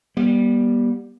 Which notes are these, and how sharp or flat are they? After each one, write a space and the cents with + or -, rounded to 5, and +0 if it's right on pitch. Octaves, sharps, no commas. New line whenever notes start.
G3 +0 B3 -45